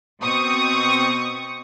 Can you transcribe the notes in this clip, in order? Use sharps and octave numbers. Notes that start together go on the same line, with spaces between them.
B2 C4 C#6 D#6